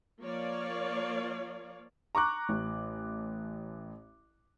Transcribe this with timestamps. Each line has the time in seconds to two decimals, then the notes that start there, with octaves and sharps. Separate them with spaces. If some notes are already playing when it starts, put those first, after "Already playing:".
0.22 F3 A#3 C#5 D5 F5
2.15 A#5 C#6 D6 F#6
2.49 A1